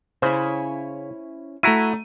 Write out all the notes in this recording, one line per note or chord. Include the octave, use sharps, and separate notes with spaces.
C#3 C#4 E4 C5
A3 E4 F#4 A#5 D#7